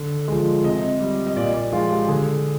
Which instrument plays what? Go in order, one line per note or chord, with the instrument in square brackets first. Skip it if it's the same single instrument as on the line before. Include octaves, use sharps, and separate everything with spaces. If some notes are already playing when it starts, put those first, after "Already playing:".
Already playing: [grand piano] D3
F3 G#3
C3 D#5
G3
D#5
A#2 D5
D5
F3 G#3 F4
G4
D3 G#4